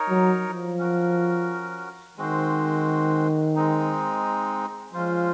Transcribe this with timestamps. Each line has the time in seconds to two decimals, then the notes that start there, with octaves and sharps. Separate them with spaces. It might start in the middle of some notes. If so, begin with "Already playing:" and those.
Already playing: D#4 A#4 C#5
0.09 F#3
0.44 F3
0.79 C#4 F#4 A#4
2.17 D#3 G#3 C4 F#4 C5
3.55 G#3 C4 D#4
4.93 F3 G#3 C#4 F4 C5